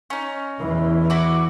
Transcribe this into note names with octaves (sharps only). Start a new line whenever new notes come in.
C#4 D#4
E2 E3
E4 F#4 D6